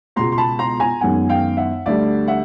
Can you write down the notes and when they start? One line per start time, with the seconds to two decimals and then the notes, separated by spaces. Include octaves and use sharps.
0.16 C#2 B2 G#3 B3 A#5 C6
0.32 C6
0.38 A5 B5
0.59 A#5 C6
0.80 G#5 A#5
1.01 F#2 D#3 G#3 B3 F#5 G#5
1.29 F5 G5
1.57 E5 F#5
1.86 D2 D3 G3 D5 E5
2.27 E5 F#5